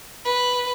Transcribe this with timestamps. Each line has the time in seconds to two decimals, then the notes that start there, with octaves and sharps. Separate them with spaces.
0.25 B4